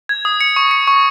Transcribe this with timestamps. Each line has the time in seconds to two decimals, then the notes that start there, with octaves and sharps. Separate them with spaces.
0.09 G#6
0.25 D#6
0.41 C#7
0.56 C#6
0.71 C#7
0.88 C#6